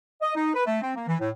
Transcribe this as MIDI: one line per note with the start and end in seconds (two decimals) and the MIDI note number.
0.21 0.34 75
0.35 0.51 63
0.54 0.63 71
0.66 0.79 57
0.81 0.94 60
0.96 1.05 58
1.08 1.15 52
1.20 1.29 45